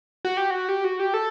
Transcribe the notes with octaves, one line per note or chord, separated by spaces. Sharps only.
F#4
G4
F#4
G4
F#4
G4
A4